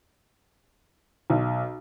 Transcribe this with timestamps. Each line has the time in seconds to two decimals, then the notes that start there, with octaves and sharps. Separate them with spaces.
1.30 B1